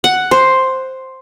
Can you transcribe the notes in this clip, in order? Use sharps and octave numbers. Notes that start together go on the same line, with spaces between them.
F#5
C5